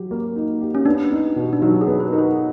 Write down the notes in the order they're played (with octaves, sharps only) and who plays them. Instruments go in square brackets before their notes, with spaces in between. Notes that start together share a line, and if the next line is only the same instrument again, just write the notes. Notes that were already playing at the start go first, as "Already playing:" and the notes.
Already playing: [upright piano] F#3 G4
A#3
D#4
G4
[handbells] C#4
[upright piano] B3 [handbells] D4
[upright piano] D#4
B2
[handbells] D4
[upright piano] F#3 [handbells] D#4
[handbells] G#4
[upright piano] B3
[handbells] B4
[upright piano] D#4 [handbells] A#4
[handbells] B4